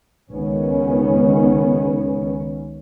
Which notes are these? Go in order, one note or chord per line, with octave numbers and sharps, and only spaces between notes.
C#2 D#3 B3 C#4